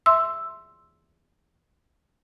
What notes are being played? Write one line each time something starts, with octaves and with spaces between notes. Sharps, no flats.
E5 C6 E6